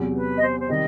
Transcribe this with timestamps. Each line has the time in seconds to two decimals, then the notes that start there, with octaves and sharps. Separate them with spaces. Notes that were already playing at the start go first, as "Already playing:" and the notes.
Already playing: E2 C3 F#3
0.16 B4
0.37 D#5
0.42 C5
0.60 C5
0.68 C3 D#3 G3 D#5